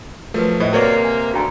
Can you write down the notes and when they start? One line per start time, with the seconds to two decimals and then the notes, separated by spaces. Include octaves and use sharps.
0.34 F3 F#3 A3 A#4 B4
0.60 A2 C5 D#5 E5
0.73 C3 A#3 F#4 B4 C#5 D5
1.05 G#5
1.34 D2 F#4 A#5